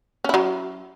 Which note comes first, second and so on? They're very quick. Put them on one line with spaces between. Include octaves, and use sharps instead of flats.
C#4 E4 F#3